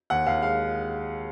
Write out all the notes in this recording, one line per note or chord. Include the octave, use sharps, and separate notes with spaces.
D#2 F#5
D#2 F5
G#3 F5